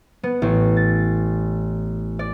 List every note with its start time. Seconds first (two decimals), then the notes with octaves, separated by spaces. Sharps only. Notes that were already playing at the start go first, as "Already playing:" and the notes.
0.23 B3
0.42 A1
0.77 A6
2.19 D5